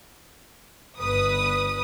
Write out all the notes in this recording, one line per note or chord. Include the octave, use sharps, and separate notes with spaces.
G1 B4 D#6